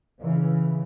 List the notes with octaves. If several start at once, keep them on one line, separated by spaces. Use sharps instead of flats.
C#3 E3